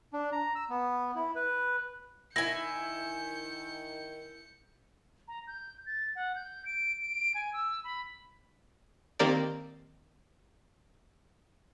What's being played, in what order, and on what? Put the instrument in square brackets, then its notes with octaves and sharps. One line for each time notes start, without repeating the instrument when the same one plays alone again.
[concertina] D4
A#5
E6
B3
E4
B4
[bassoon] D#3 [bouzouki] E4 G#5 [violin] G6 C#7 [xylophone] A#6
[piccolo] A#5
G6
A6
F#5
G6
D7
D7
G#5
E6
B5
[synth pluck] D#3 A#3 C4 G4 A#4 D5